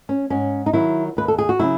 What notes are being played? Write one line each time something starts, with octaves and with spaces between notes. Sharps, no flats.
C#4
G#2 C#4
D#4
D#3 F#3 E4
D#2 B4
A4
G#4
F#4
C#3 F#3 E4